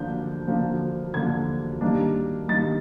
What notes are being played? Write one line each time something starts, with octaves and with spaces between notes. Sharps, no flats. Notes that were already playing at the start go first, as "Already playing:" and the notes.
Already playing: D3 F3 A#3 D4 G6
D3 F3 A#3 D4
D3 F3 A#3 D4 G#6
D#3 G3 A#3 D4
D#3 G3 A#3 D4 A6